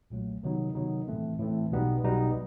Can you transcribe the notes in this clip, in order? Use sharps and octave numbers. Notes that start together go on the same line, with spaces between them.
B1 A#2 F#3 A3
C3 D#3 F#3 B3 D#4
C3 D#3 F#3 B3 D#4
A2 E3 A3 C4
A2 E3 A3 C4
B1 B2 G3 B3 D#4
B1 B2 G3 B3 D#4